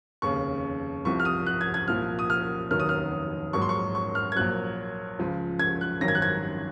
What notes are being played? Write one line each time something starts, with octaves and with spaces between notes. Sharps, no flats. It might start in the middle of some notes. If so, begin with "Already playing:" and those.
F1 D#2 C#3 C#6
C2 C3 F3 C#6
F6
D#6
F#6
G#6
G#6
C2 A#2 F3 F6
D#6
F6
F1 D#2 D#3 F#3 F6
D#6
F6
A#1 G#2 F#3 C#6
C6
C#6
C#6
F6
G#6
A#1 A#2 F#3 F#6
C#2 C#3 F3
G#6
F#6
G#1 F#2 D#3 F#3 A#6
G#6
F#6
G#6